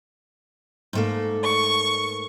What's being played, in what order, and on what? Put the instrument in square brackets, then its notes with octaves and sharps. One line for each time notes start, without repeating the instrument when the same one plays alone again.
[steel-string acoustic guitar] G#2 A3 A#3
[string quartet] C#6